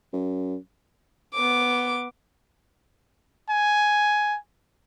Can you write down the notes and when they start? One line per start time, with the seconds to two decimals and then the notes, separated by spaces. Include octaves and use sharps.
0.13 F#2
1.34 B3 D6
3.50 G#5